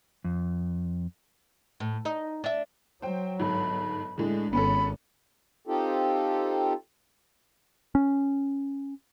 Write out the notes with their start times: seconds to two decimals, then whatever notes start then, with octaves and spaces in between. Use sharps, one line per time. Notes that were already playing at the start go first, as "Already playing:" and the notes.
0.24 F2
1.80 A2
2.05 D#4
2.44 D4 E5
3.02 F#3 C5 G5
3.40 G1 G#2 B5
4.18 A2 D3 G#3
4.53 G#1 B3 C#4 A4 B5
5.67 C4 D#4 F4 G4 A4
7.95 C#4